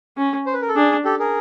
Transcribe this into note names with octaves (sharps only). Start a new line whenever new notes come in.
C#4
C5
B4
A#4
A4
D4 G#4
G4 A4
G#4 A#4